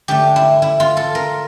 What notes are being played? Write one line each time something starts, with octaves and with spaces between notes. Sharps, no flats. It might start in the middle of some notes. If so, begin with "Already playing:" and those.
D3 A3 G4
E4
E4
F4
A4
A#4